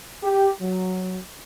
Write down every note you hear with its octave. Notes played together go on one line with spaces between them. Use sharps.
G4
F#3